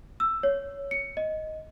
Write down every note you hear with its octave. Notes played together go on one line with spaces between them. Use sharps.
E6
C#5
C#7
D#5